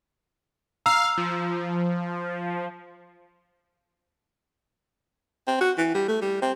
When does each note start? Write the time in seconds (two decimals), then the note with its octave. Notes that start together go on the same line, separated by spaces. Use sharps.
0.86 F5 A#5 E6
1.17 F3
5.47 C4
5.61 F#4
5.78 E3
5.94 G3
6.08 A3
6.22 G3
6.42 C4